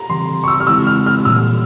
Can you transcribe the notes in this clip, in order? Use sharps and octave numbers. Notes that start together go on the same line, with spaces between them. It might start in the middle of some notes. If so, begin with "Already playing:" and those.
Already playing: A#5
C#3 E3 G3 C4 C6
C#6
E6
F6
C#3 E3 G#3 C4 E4 E6
F6
F6
A#2 G3 A#3 E6